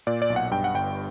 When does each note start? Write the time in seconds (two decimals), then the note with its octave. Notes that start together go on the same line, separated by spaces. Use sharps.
0.07 A#2 D5
0.22 D5
0.30 B1
0.36 F#5
0.51 G2 G5
0.64 F#5
0.74 G1 G5